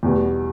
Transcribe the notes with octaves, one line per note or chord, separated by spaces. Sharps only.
E2 B2 G3 B3